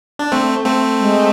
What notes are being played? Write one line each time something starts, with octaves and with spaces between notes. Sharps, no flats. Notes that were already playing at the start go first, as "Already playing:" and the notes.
D4
A3 C4
A3 C4
G#3